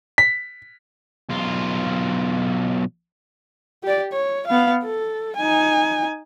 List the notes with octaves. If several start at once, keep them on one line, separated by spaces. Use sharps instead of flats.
B6
B1 F4
G4 D5
C#5
B3 F5
A4
D#4 G#5